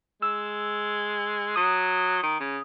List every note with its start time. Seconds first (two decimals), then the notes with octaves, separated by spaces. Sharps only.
0.22 G#3 E6
1.56 F#3 D#6
2.23 D#3
2.40 C#3